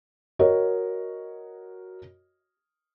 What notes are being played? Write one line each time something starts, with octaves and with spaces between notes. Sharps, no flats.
F#4 A#4 C#5 D#5